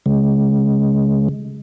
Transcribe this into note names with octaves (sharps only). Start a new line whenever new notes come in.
C#3 G#3